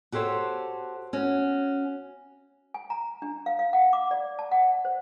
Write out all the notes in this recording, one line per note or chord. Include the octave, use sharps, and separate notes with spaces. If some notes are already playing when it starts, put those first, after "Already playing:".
F#4 G4 A4 C5 C#5
C#4 F#4
G#5
A#5
D4
F5
F5
F#5
D6
D5
A5
F#5
C5